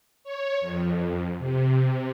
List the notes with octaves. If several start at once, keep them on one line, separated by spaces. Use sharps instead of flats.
C#5
F2
C3